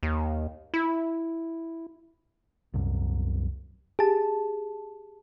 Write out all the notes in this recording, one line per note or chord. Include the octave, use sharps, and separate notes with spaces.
D#2
E4
C2 F#2
G4 G#4 A5